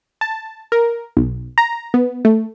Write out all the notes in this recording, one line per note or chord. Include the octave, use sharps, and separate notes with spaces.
A5
A#4
B1
A#5
B3
A3